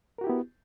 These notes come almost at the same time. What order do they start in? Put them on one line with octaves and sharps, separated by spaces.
A#4 F#4 G4 E4 B3